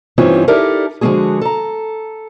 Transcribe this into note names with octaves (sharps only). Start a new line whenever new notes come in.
G2 E3 C4 C#4 D#4 F4
D#4 E4 G4 A4 A#4 D5
D3 F3 G#3 C4 F#4 G#4
A4 A#5